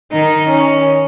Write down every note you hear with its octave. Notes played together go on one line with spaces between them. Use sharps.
D#3 D#4
C#4